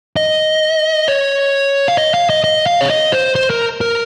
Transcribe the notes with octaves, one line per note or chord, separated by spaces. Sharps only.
D#5
C#5
F5
D#5
F5
D#5
D#5
F5
C#5
D#5
C5
C5
A#4
A#4